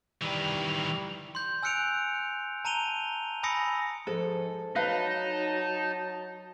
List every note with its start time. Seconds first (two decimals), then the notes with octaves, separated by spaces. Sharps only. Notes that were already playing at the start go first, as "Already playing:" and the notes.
0.22 D#3 E3 G3 F7
1.35 C6 G6
1.63 G#5 E6 F#6 C#7 D7 F7
2.65 A5 A#5 D#7 F7 G7
3.43 G#5 B5 D#6 E6 A#6 C#7
4.07 G#2 F3 A4
4.76 F#3 D#4 B4 F5 A5